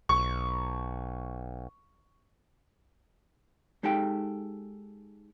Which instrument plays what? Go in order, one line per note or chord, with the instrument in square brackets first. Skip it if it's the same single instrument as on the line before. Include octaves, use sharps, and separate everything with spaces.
[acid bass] B1 [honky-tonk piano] C#6
[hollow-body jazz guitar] G#3 D#4 G4 A4 G5